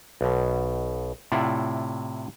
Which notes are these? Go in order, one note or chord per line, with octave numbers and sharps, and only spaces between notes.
B1 B2
A2 C3 E4 F4 D5 F#5